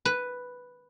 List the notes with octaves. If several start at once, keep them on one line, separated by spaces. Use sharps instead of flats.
B4